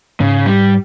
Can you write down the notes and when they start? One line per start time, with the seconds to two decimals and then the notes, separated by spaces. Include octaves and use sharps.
0.20 G#2 C#3
0.46 G3